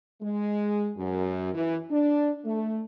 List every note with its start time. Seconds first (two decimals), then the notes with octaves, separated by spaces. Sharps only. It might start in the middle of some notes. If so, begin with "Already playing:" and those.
0.22 G#3
0.97 F#2
1.54 E3
1.91 D4
2.45 A3